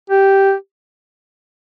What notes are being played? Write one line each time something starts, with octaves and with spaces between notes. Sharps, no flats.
G4